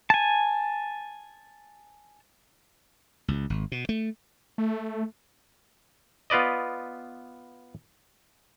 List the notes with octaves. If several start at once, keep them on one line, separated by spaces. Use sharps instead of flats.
G#5 A5
C#2
G#1
B2
A3
A3
B3 F4 B4 D5 D#5